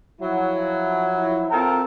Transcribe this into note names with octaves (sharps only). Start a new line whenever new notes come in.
F3 F#3 E4
C4 F4 A4 A#4 G5 A#5